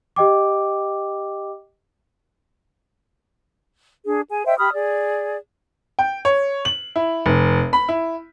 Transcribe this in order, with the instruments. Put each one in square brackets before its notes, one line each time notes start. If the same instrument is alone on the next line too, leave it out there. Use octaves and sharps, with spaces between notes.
[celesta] G4 D#5 G5 D6
[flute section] D4 G#4
G#4 G#5
C5 D#5 E5 G5
G4 B5 D#6 F6
G#4 D5
[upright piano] G5
C#5
F#7
E4
F1
B5
E4